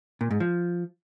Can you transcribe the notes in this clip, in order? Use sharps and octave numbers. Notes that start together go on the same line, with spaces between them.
A#2
G#2
F3